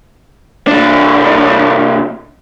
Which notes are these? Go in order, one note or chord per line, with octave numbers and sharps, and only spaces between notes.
C2 D4